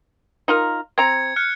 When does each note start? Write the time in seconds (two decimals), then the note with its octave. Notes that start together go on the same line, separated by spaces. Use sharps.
0.48 D#4 F4 A#4
0.98 C4 A#5 G#6 C#7
1.36 F6 F#6 C#7